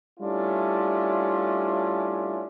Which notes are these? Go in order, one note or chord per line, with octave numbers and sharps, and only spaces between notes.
G3 A3 C#4 D4 E4 F4